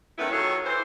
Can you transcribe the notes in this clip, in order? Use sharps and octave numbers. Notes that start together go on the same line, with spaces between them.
G#2 D#3 A3 B3 C#4 E4
D#3 F#3 F4 G#4 A4 C#5
E3 C5